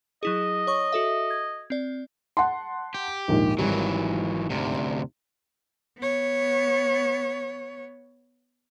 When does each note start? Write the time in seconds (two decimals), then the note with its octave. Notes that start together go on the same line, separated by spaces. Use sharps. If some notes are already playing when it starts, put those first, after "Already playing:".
0.23 F#3 E4 G#4 D#5
0.67 C#5 C#6
0.92 F#4 A4 E5
1.31 G#6
1.70 C4 D5
2.37 F#5 A5 C6
2.94 G4
3.28 A#1 D#2 G#2
3.59 G#1 D#3 E3 F#3 G3
4.50 D2 C3
5.98 B3 C#5